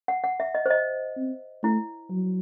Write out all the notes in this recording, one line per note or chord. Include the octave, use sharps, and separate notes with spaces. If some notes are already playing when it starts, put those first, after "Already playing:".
F#5
F#5
E5
D#5
C5
D#5
C4
A3 E4
F#3